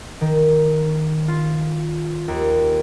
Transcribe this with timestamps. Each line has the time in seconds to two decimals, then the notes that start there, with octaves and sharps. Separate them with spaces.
0.21 D#3
1.28 F4
2.28 D#2